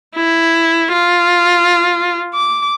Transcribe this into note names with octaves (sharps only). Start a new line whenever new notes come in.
E4
F4
D6